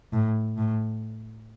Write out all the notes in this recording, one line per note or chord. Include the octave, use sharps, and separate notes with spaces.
A2
A2